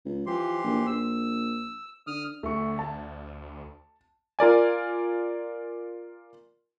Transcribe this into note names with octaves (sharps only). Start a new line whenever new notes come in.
C#2
E3 F3 G4 C6
A#1
A#1 E6
D3 D#6 F6
D2 A3 C#6
A5
F4 A#4 D5 G#5